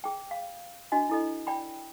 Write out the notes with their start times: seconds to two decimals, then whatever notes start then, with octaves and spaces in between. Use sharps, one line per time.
0.04 G#4 G5
0.31 F5
0.92 D4 F#4 D#5 G#5
1.09 E4 A4 D#5
1.47 D5 G5 B5